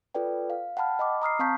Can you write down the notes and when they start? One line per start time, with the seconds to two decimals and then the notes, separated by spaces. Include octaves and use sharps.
0.15 F4 A4 B4 D5 G5
0.50 F5
0.77 F#5 G5 A5 B5 F6
0.99 D#5 B5 D6
1.22 A#5 D#6 F6 C7
1.39 C4 F5 A5 C#6 G6 B6